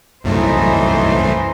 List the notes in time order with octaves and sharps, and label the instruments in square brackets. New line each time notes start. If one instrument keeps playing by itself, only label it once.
[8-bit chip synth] C2 F#2 A3 [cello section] E3 D#4 C5